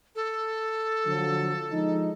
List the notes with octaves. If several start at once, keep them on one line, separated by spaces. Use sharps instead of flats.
A4
D3 F3 F#3
F3 G#3 D#4